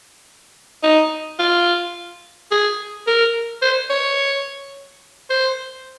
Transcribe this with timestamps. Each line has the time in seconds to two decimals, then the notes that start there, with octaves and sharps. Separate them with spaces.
0.83 D#4
1.39 F4
2.51 G#4
3.07 A#4
3.62 C5
3.90 C#5
5.30 C5